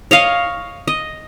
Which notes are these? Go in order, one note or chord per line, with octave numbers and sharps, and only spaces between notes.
C#5 D#5 F5
D#5